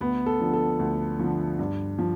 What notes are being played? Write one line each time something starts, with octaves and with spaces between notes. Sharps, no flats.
D2 B3
A4
D3 F3
A4
D2
D3 F3
G2
F3